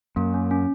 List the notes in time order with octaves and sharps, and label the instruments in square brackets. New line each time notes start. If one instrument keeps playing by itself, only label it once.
[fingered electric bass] F#2 [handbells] A#3
[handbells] C#4
C#4